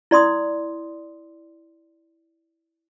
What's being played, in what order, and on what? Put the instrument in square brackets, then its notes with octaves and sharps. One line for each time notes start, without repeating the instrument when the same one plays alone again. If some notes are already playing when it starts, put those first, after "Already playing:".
[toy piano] E4 D5 C6 D#6